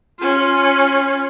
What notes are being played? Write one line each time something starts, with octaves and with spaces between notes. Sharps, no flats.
C#4 F4